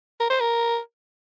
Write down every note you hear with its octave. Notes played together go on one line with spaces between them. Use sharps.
A#4
C5
A#4